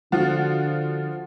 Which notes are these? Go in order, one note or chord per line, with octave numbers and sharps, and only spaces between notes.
D3 F3 F4 F#4